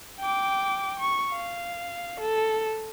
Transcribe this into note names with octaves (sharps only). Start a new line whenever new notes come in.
G5 D6
C#6
F5
A4